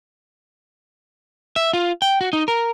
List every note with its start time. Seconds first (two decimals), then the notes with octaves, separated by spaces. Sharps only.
1.56 E5
1.73 F4
2.02 G5
2.21 F#4
2.33 D#4
2.48 A#4